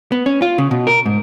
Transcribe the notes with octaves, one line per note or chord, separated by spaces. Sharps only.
B3
C#4
F4
C#3
B2
A#4
G#2